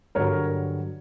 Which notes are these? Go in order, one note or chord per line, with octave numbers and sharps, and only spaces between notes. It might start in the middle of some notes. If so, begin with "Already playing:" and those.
G2 D3 F#3 A#4 C#5